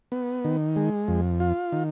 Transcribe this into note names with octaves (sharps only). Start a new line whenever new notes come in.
B3
D#3
G#3
F2
F4
D#3